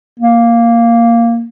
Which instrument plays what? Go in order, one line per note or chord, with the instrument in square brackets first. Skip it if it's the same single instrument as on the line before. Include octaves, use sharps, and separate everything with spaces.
[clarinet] A#3